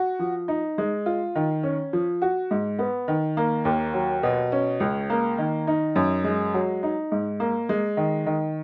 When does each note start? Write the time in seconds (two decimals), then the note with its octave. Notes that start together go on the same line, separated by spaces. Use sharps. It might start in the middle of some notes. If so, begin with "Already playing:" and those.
Already playing: F#4
0.19 F3
0.48 D#4
0.78 G#3
1.06 F4
1.35 D#3
1.63 C#4
1.93 F3
2.22 F#4
2.51 G#2
2.79 B3
3.08 D#3
3.37 A#3
3.65 D#2
3.94 F#3
4.23 B2
4.52 C#4
4.80 C#2
5.10 A#3
5.38 D#3
5.67 D#4
5.96 F#2
6.24 G#3
6.54 F#3
6.83 D#4
7.12 G#2
7.40 A#3
7.69 G#3
7.97 D#3
8.26 D#3